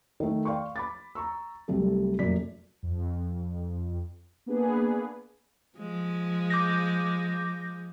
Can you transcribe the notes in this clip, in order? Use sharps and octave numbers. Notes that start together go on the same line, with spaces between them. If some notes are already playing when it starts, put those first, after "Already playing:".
D#3 A3
D5 F5 G5 C6 C#6
B5 D6 A6
A#5 C#6 E6
C2 C3 F#3 G3 A3 A4
F1 F#2 A#2 A4 D5 B6
F2
A#3 B3 D4 G#4 B4
F3 G#3
D6 G6 A#6